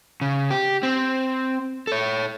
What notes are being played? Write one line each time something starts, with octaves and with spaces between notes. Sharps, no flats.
C#3
G4
C4
A4 C#5